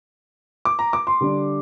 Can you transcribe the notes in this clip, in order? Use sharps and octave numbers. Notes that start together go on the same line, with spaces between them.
D6
A#5
D6
C6
D3 G3 D4